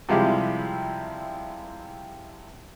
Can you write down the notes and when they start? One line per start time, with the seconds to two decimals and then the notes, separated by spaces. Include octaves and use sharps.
0.09 C3 F3 G3 G#3 E4 G4